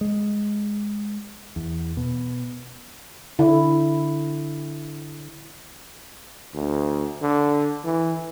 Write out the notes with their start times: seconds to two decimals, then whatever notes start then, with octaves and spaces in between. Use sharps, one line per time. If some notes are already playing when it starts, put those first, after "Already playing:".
0.01 G#3
1.56 E2
1.97 B2
3.39 D3 E4
6.54 D2
7.22 D3
7.84 E3